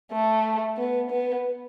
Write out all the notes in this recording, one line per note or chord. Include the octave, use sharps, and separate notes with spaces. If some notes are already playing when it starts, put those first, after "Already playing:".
A3
B3
B3